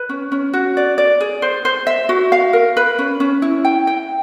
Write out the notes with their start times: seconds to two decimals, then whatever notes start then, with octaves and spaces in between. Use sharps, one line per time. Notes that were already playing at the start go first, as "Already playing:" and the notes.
Already playing: B4
0.09 C#4
0.32 C#4
0.53 F#4
0.77 D5
0.98 D5
1.21 G#4
1.42 C5
1.65 C5
1.87 E5
2.09 F#4
2.32 F5
2.53 A#4
2.77 B4
2.99 C#4
3.20 C#4
3.42 E4
3.65 G5
3.87 G5